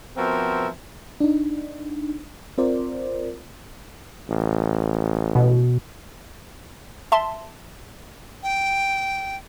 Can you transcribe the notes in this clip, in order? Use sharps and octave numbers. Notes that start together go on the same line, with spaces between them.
F3 B3 C4 F#4 A#4 E5
D4 D#4
C4 F4 A#4 C5 D5
A1
B2
E5 A5 C6
G5